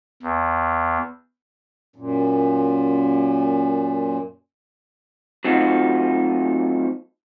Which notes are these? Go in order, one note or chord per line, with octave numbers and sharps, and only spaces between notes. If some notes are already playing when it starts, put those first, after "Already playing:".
E2
F#2 A#2
F#3 A3 C4 D#4 F4 F#4